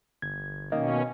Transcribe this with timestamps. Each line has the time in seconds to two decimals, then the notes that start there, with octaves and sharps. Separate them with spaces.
0.22 G1 G#6
0.72 B2 D#3 A#3 C#4 D#5